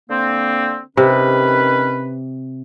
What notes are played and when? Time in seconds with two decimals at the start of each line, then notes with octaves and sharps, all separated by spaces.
0.10 D3 A#3 C4
0.97 C3 D#3 C#4 B4